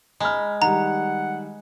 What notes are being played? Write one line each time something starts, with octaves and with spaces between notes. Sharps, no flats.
G#3 A#5 B5 F6
D#3 G3 F#5 A#5